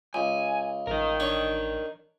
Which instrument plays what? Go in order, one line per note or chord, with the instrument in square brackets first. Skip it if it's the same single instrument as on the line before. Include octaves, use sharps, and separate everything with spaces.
[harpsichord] C#2 [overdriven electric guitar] G#5
[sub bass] A1 [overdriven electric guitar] A#4 D#5
[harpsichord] D4 C#5